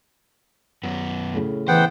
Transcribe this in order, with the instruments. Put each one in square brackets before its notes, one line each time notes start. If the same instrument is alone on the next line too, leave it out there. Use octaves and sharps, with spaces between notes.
[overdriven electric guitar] F#2 B3
[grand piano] A2 C#3
[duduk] E3 [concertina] B3 F#5 G5 [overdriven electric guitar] C5